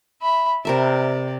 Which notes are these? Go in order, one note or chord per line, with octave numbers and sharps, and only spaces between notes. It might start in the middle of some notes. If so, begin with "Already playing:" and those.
E5 B5
C3 A#4 D5 E5